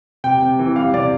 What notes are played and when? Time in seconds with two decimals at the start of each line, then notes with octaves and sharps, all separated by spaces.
0.24 C3 G5
0.42 C3
0.59 E3
0.76 G3 F5
0.94 C3 D5